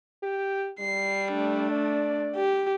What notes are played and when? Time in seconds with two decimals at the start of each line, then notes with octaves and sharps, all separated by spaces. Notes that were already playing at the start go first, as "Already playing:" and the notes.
0.23 G4
0.80 G3 C7
1.32 A3 D4
1.71 D5
2.36 G4